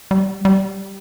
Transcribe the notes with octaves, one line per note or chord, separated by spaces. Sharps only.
G3
G3